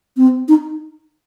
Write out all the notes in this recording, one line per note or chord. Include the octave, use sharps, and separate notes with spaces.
C4
D#4